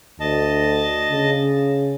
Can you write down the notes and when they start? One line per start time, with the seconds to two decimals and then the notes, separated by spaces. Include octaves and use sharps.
0.20 D2 D#5 A5
1.12 C#3